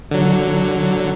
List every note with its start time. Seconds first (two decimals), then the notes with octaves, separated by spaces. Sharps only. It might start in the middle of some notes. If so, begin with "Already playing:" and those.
0.11 D3 F#3